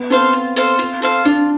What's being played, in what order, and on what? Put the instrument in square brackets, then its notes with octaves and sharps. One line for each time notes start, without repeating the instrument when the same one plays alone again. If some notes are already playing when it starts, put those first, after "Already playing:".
Already playing: [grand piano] B3
[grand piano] C4 [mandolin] A4 C5 F5
[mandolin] F4
A4 C5 F5
F4
A4 C5 F5
[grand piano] D4 [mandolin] F4